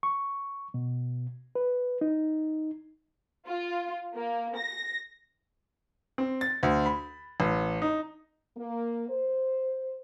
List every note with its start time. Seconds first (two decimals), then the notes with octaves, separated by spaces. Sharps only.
0.03 C#6
0.74 B2
1.55 B4
2.01 D#4
3.47 F4
4.15 A#3
4.56 A#6
6.18 C4
6.41 A6
6.63 D2
6.86 B5
7.40 A1
7.82 D#4
8.57 A#3
9.10 C5